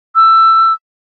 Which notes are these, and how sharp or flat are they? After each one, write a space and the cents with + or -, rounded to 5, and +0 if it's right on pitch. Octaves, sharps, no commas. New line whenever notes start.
E6 +15